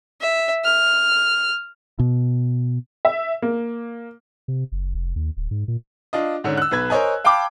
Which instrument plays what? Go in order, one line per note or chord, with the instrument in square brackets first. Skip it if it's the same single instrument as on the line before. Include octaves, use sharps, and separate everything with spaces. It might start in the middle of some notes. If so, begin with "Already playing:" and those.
[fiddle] E5
F6
[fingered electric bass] B2
[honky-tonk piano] E5
A#3
[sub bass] C3
F#1
F1
D#2
D1
G#2
A#2
[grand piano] D4 F4 D#5
G#2 D3 C#4
E6 F#6
B1 B4 G#6
A#4 C5 C#5 D#5 G#5
F5 G5 A5 B5 D6